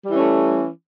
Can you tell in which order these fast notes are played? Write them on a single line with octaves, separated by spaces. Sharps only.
G3 E3 C#4 A3